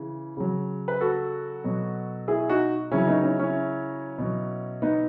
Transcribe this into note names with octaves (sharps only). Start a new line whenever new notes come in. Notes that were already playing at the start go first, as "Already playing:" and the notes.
Already playing: C#3 E3
C#3 F#3
B4
F#4 A4
B2 F#3
E4 G#4
D#4 F#4
C#3 F#3 C#4 E4
B3 D#4
C#4 E4
C#4 E4
B2 F#3
B3 D#4